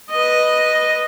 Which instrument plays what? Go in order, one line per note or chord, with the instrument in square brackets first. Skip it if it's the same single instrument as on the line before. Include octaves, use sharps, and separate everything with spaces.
[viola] B4 D#5